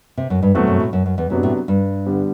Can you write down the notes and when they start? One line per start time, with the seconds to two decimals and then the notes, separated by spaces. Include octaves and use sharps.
0.17 C3
0.30 F#2
0.43 G2
0.55 E2 B2 F#3 A3 C4 F#4
0.67 F#2
0.80 A2
0.93 F#2
1.06 F#2
1.18 E2
1.30 F#2 C3 F#3 B3 D4
1.43 A2
1.68 G2
2.06 D3 G3 B3